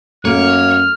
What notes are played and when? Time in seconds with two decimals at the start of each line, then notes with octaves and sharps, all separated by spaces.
0.25 F#2 A#3 C#5 F6